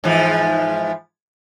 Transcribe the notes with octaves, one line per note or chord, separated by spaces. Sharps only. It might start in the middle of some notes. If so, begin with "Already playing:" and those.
G#2 E3 F3